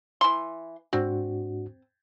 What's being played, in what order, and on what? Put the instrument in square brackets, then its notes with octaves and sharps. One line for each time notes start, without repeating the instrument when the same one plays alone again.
[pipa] E3 C6
[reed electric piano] G#2 D4 F#4 [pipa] C4